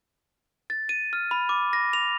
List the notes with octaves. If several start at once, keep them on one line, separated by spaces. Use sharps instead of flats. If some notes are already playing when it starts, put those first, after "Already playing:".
A6
D#7
F6
B5
D6
A#6
F7